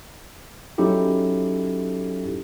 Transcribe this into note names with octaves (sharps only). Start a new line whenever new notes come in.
F#3 C#4 D#4 E4 G4 A4